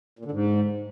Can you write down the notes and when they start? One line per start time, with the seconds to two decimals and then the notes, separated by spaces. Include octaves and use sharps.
0.19 A#2
0.25 D3
0.31 G#2